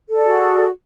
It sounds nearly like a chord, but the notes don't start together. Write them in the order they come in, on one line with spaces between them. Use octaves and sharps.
A4 D5 G#4 F#4